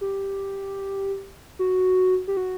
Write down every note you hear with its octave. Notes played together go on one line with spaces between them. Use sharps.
G4
F#4
G4
F#4